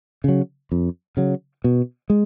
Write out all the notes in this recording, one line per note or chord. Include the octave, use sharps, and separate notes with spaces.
C#3 F#3
F2
C#3 F#3
B2
G#3